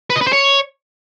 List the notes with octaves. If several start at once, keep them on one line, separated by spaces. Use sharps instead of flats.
B4
D#5
B4
C5
C#5